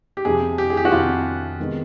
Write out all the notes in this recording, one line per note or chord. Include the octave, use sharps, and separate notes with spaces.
G4
F2 C3 F3 G#4
G4
G#4
G4
F#4
F2 C3 F3 F4
C3 D#3 G#3 B3